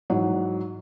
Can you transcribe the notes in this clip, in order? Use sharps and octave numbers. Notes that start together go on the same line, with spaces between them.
G#2 E3 F#3